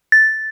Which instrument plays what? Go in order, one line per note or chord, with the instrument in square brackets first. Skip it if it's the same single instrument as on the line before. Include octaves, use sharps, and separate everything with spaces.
[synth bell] A6